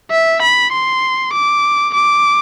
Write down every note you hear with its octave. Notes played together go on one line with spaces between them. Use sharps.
E5
B5
C6
D6
D6